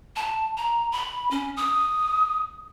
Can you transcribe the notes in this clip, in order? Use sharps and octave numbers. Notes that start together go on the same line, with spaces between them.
A5
A#5
B5
C#4
D#6